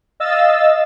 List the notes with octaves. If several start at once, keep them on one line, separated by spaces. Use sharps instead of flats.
D#5 F5 E6 A6